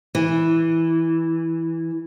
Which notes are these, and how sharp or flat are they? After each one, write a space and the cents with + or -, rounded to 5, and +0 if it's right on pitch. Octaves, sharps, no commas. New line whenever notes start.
E3 -5